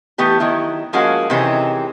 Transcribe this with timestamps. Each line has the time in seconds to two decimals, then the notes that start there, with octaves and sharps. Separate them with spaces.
0.18 E3 A3 B3 G4
0.40 D#3 F#3 E4
0.93 F3 G#3 A#3 C#4 F#4
1.30 C3 D#3 E3 G#3 C4 C#4